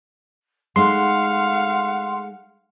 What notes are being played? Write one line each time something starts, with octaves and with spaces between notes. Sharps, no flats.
G#3 A3 D#4 F5 F#5 C6